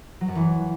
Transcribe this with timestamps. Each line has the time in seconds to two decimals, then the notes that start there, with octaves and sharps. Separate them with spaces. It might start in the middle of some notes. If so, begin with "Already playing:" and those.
0.21 F#3
0.28 F#2
0.35 E3